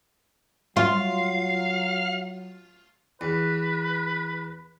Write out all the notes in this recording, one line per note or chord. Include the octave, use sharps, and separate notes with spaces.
F#3 F4 F5
E2 B4